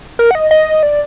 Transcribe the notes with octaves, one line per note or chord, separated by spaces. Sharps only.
A#4
F#5
D#5
D#5
D5